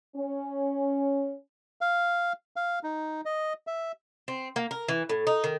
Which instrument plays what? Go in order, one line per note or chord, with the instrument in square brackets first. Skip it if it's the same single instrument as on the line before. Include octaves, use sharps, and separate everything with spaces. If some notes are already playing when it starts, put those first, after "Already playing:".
[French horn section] C#4
[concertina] F5
F5
D#4
D#5
E5
[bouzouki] C4
A#3
A#4
E3
A2
D#4
D#3